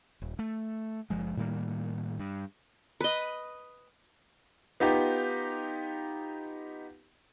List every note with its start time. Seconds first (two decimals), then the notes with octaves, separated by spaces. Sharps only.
0.21 D#1
0.39 A3
1.10 F#1 F3 G#3
1.37 A2 D#3 G3 A#3
2.19 G2
3.01 B4 D#5
4.80 B3 D#4 F4 G4